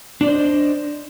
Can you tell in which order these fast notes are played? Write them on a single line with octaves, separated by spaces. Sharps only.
D4 D5 C5 D#5